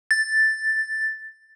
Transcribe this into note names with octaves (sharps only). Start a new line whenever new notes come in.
A6